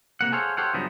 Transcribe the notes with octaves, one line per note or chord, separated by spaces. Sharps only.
C3 A#3 F#5
G#4 A4 C5 C#5 F5 F#5
G4 A4 C5 C#5 F5 F#5
G2 C#3 F3 F#3 B3 D#4